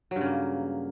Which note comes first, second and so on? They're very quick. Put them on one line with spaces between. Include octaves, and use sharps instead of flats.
F#3 G2 C#3 A#3